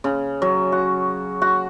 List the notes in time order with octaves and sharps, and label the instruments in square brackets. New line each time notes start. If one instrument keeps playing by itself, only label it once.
[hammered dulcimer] C#3
F#3
F#4
F#4